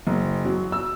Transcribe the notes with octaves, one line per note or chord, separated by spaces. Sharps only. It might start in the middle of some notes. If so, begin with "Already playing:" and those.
F#1
F#3
E6